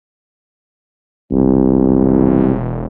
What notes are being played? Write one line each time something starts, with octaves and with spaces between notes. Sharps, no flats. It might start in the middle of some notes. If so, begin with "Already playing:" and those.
E1 C2